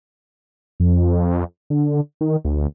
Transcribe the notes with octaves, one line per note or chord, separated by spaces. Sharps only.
F2
D3
D#3
D2